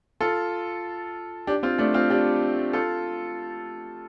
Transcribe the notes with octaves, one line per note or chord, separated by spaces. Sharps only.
F4 A4
D4 G4
C4 F4
A3 D4
C4 F4
D4 G4
F4 A4